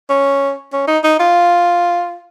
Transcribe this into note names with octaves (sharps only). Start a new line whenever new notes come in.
C#4
C#4
D#4
D#4
F4